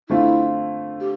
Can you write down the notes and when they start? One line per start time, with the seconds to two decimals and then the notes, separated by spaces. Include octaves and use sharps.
0.09 D3 A3 C4 E4 F4
1.00 G4